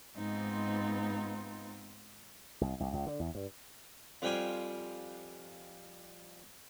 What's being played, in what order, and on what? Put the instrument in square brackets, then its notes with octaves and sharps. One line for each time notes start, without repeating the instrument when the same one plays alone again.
[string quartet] G#2 B3 C4 D#4 F4
[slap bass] C2
C2
C#2
D3
E2
G2
[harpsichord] F2 F3 G3 G5 G#5 C6